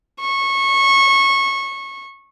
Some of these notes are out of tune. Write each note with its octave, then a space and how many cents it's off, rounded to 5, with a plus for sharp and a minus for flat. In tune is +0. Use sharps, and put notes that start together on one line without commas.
C#6 -20